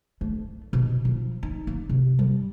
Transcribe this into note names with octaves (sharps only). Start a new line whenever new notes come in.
A3
B2
F3
D#4
A#3
C3
G3